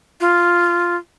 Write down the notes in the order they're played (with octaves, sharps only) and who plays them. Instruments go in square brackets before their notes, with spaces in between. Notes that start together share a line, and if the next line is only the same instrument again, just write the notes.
[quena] F4